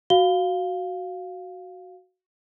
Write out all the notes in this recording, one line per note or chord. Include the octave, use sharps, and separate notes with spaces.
F#4 F5 G7